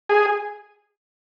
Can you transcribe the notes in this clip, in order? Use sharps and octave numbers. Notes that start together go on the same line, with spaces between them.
G#4